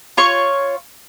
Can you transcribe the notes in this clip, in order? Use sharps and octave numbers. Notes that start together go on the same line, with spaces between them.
F4 C#5 C#6